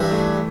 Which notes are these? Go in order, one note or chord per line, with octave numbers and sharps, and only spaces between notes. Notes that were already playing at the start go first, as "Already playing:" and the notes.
Already playing: G2 E3 G3 D4 C5 E5
A3